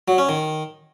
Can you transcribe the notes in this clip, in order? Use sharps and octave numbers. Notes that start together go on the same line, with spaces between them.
F#3
C#4
D#3